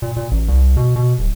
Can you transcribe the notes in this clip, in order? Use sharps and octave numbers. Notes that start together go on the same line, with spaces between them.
A#2
A#2
A1
C2
B2
B2
D1